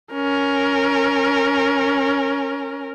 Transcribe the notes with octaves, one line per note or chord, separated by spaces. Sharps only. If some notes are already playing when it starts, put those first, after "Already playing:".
C#4 A#4